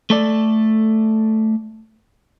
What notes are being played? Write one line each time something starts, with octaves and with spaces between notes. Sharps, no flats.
A3 A4 D5